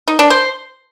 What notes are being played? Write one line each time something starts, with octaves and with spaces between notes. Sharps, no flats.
D#4
D4
C5